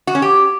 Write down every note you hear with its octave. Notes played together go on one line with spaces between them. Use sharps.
F#4
C#4
G4